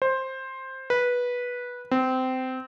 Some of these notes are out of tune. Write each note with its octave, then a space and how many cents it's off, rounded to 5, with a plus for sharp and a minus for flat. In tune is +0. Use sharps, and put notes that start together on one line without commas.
C5 +10
B4 -15
C4 -20